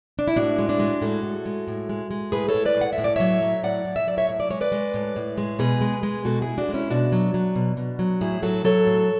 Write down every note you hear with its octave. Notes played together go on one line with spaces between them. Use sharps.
D4
E4
A2 D4 F#4
G#3
D4 F#4
G#3
A2 F#4 A4
A2
G#3
A2
G#3
G#3
A2 G#4 B4
A4 C#5
A2
B4 D5
G#3 F#5
E5
A2
D5
F#3 C#5 E5
F#3
A2 D5 F#5
A2
E5
F#3 D5
C#5 E5
A2 E5
D5
G#3 C#5
B4 D5
G#3
A2
A2
G#3
B2 G#4 B4
G#3
G#3
B2 F#4 A4
E4 G#4
B2
D4 F#4
G#3
C#4 E4
B2 D4 F#4
F#3
F#3
B2
B2
F#3
A2 E4 G#4
F#3 F#4 A4
F#3 A4 C#5
A2